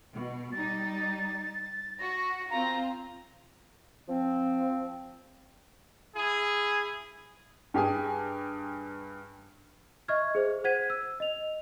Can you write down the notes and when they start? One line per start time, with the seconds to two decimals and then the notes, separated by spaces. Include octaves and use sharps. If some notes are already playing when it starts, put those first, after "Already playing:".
0.15 B2
0.52 G3 D#4 A6
1.99 F#4 A#6
2.51 C4 F4 A#5
4.08 F3 C4
6.15 E4 G#4
7.74 G2 G4 G#4 G#5
10.08 D#5 E5 C#6 F6 G#6
10.35 G#4 C5
10.64 C5 F#5 G#6 B6 D#7
10.90 E6
11.20 D#5 F7